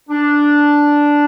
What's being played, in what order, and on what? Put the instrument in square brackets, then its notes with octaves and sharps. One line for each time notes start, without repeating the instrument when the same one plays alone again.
[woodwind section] D4